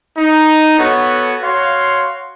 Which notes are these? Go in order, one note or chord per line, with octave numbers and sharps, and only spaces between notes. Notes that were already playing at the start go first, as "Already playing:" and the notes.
D#4
B3 F#4 A4 C#5
F#4 C#5 F5 C6